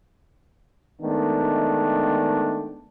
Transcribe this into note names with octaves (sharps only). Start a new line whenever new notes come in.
D#3 G#3 A3 B3 D4